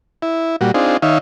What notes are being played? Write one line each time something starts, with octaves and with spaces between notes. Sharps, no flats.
E4
A#2 G3 F#4
C4 D4 D#4 F4 G#4
D#3 D#4 C#5 E5 F5